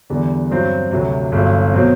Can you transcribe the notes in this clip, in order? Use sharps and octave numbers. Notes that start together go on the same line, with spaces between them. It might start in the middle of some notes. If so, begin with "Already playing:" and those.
E2 D3 G3
G2 F#3 C4
D2 C3 F#3
G1 G2 F#3
B2 F#3 C4